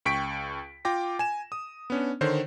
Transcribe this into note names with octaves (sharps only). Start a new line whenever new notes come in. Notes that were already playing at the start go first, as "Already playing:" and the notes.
C#2 G5 C#6 B6 D7
F4 G5 D6 A#6
G#5 E7
D#6
B3 C#4 D4
D3 D#3 C5 C#5